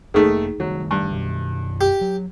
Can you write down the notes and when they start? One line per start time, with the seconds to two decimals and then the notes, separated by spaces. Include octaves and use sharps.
0.14 F1 D#3 A3 A#3 D#4 G#4
0.60 D#3 F#3 G3 A3
0.91 G2
1.11 F#2 B2 D#3
1.81 G4
2.01 F#3